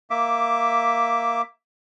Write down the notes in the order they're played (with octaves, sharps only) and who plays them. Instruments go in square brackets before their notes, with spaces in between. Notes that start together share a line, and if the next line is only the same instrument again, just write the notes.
[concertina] A#3 E5 D6